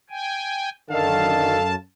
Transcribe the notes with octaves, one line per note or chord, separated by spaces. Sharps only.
G5 G#5
F#2 D3 D#3 A4 F5 A5